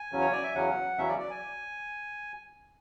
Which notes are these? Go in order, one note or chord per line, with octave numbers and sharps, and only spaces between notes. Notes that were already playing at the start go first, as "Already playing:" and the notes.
Already playing: G#5
E2 C#3 F#3 C#4
C#5
D5
E5
E2 C#3 F#3 C#4 F#5
E2 C#3 F#3 C#4 E5
D5
D5
G#5